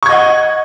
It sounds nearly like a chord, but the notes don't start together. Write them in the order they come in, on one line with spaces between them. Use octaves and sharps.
C#6 G#6 D#5 F#5